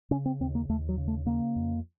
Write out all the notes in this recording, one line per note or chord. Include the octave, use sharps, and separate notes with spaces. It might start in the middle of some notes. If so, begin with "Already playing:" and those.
C#3 C#4
C4
D#2 C4
A#3
D#2 A3
F#3
C#3
A3
C#3 A#3
F2